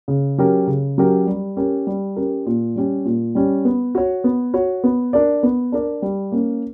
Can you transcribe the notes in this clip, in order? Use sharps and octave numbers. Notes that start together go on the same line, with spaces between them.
C#3
F#3 C#4 G4 A#4
C#3
F#3 C#4 G4 A#4
G3
C#4 G4 A#4
G3
C#4 G4 A#4
A#2
G3 C#4 G4
A#2
G3 C#4 G4
B3
F#4 C#5
B3
F#4 C#5
B3
D4 A#4 D5
B3
D4 A#4 D5
G3
A#3 C#4